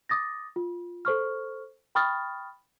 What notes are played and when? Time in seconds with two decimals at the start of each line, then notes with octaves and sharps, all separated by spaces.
0.09 D6 D#6 A6 A#6
0.56 F4
1.05 A4 C5 C#6 F6
1.95 G5 B5 C#6 D#6 F6 A6